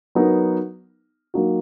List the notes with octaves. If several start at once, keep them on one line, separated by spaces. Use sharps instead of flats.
F#3 B3 D#4 A#4
F#3 A#3 D#4 F#4